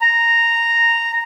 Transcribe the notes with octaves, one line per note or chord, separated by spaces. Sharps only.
A#5